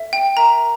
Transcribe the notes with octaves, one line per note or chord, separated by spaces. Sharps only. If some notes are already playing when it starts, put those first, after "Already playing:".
Already playing: A4 E5
G5
A#4 E5 G5 A#5